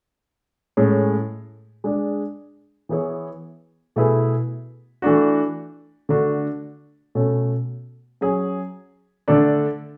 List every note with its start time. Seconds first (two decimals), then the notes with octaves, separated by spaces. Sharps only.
0.77 A2 G#3 C#4
1.84 G#3 D4 G#4 D5
2.89 E3 B3 E4 G#4 C#5
3.96 B2 A3 E4 G#4 B4
5.02 E3 A3 D4 F#4
6.09 D3 A3 D4 F#4
7.15 B2 A3 C#4
8.21 F#3 C#4 G#4 C#5
9.28 D3 A3 D4 A4 D5